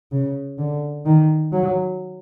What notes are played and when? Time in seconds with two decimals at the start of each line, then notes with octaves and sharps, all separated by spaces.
0.12 C#3
0.58 D3
1.05 D#3
1.52 F#3